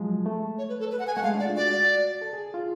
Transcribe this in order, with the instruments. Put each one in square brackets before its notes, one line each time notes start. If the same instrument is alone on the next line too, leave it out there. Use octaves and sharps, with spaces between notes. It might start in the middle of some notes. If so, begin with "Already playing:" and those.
Already playing: [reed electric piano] F3 F#3 G#3
A3
[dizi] C#5
B4
A4
B4
F#5
G#5
[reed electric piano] A3 [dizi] F#5
[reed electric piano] G#3 [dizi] F5
[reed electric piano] D4
[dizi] D5
[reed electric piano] F4
[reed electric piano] F#4 [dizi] D5
[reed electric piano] A4
G#4
F4